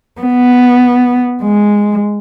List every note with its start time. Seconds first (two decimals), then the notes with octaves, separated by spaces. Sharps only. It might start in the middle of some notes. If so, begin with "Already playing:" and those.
0.21 B3
1.42 G#3